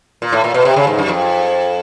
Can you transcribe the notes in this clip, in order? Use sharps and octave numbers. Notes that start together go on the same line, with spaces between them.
A#2
A2
A#2
B2
C3
C#3
G#2
F#2
F2